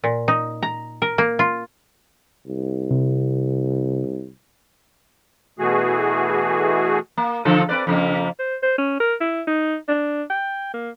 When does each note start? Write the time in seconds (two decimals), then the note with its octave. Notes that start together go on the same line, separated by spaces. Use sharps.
0.04 A#2
0.28 D#4
0.63 A#5
1.02 A#4
1.18 A#3
1.39 F4
2.46 C2
2.91 C3
5.59 B2 E3 A3 F#4 G#4
7.17 A#3
7.45 D3 F3 A4
7.69 C4 B4 D5
7.87 F2 C#3 A#3
8.39 C5
8.63 C5
8.78 C#4
9.00 A#4
9.21 E4
9.47 D#4
9.88 D4
10.30 G5
10.74 A#3